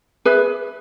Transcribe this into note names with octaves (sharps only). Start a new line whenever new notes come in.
G#4 B4 E5